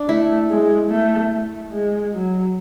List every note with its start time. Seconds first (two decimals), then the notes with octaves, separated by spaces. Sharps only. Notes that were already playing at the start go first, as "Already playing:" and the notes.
Already playing: D4
0.08 A3 E4
0.50 G#3
0.90 A3
1.32 A3
1.72 G#3
2.13 F#3